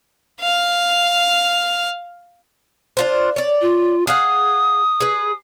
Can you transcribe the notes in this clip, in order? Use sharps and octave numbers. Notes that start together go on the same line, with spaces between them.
F5 F6
D4 F4 C5
C#5 D5
F4
G#4 F5 F#5 D#6
G#4 B4